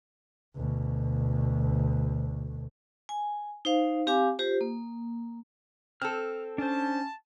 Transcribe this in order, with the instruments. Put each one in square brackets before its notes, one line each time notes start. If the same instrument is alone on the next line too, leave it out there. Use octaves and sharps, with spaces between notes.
[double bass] D2 B2
[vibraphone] G#5
D#4 C5 F5
C4 G4 F5 G#5 D6
F4 G4 C5
A#3
[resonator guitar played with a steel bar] C4 A4 [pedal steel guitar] F6
[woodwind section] C#4 [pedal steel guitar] D4 C5 [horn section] A5